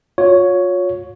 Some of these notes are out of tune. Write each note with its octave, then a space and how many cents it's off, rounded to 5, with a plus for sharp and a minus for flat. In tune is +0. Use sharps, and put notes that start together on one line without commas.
F4 +40 C#5 +5